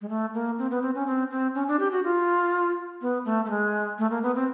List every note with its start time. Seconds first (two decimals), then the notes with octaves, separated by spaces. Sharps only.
0.01 G#3
0.09 A3
0.34 A#3
0.59 C4
0.71 B3
0.82 C4
0.95 C#4
1.07 C4
1.31 C4
1.55 C#4
1.68 D4
1.80 G4
1.92 F#4
2.04 F4
3.02 B3
3.25 A3
3.45 A3
3.50 G#3
3.98 A3
4.11 A#3
4.23 B3
4.35 C4